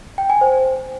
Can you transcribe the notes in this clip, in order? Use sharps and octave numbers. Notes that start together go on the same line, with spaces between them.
G5
G#5
C5